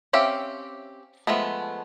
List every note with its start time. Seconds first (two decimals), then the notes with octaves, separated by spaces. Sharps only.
0.13 C4 C#4 G4 E5 F5
1.27 F3 G#3 A3 B3